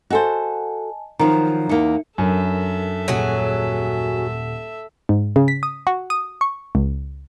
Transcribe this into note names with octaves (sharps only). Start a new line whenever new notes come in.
F#4 A4 C5 D#5 G#5 A5
D#3 F3 F#3 A#5
E2 A#3 D#4 E5 C#7
F#2 D4 A4 A#4 E5
D#1 F#3 G#4 F#5
G#2
C#3
B6
D#6
F#4
D#6
C#6
C#2